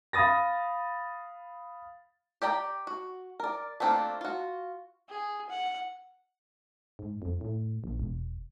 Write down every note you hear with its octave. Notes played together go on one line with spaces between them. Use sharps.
F5 B5 D#6 A6 A#6
G4 D5 G5 A#5
F#4
A#4 D5
A3 A#3 C4 D4 F4
F4 F#4
G#4
F#5
G#2
F2
A2
A#1
E1